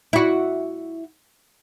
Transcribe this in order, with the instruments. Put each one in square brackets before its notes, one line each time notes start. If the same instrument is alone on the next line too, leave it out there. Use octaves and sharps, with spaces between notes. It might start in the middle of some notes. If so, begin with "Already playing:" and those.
[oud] E4 F#4